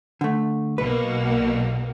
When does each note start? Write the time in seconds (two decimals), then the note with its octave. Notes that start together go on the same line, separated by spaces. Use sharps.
0.21 D3 A3
0.78 B1 B2 A#3 B4